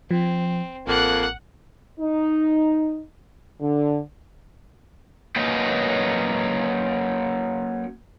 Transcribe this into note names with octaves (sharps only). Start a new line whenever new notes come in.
F3 C4
A1 F2 A#3 F#5 F#6
D#4
D3
F#3 A#3 C#4 B4 D#5 G5